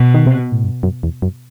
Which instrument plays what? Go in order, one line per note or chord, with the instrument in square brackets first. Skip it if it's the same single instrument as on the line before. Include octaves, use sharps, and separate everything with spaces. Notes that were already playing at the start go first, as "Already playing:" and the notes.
Already playing: [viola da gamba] B2
[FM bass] D#3
C3
B2
A2
G2
F#2
E2
F#2